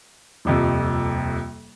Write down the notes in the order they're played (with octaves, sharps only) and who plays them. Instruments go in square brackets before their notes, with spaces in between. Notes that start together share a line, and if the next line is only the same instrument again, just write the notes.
[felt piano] D#1 F2 C3